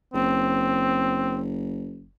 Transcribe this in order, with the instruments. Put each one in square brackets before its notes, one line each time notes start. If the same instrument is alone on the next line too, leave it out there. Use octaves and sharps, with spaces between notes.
[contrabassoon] F#1 [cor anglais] C4